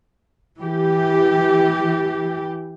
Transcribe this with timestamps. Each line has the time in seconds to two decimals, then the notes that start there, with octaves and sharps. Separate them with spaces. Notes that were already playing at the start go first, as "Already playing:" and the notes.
0.60 E3 G4